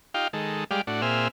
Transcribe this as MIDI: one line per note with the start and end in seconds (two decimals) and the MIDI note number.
0.14 0.28 63
0.14 0.28 65
0.14 0.28 67
0.14 0.28 77
0.14 0.28 79
0.33 0.64 51
0.33 0.64 56
0.33 0.64 69
0.71 0.81 55
0.71 0.81 56
0.71 0.81 67
0.71 0.81 74
0.71 0.81 77
0.87 1.01 45
0.87 1.01 62
0.87 1.01 66
1.02 1.28 46
1.02 1.28 60
1.02 1.28 68
1.02 1.28 76
1.02 1.28 89